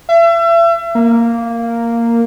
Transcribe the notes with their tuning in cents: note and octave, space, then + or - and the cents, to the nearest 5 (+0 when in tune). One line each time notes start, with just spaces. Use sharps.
E5 +35
A#3 -5